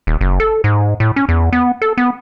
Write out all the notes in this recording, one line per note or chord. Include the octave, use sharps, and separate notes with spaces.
D#1
F#1
A4
G#2
A2
C#4
E2
B3
A4
B3